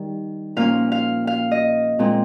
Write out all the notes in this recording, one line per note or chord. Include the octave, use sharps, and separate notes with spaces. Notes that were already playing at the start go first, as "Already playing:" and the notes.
Already playing: D#3 G3
A#2 F3 A#3 C#4 F5
F5
F5
D#5
A#2 G#3 C4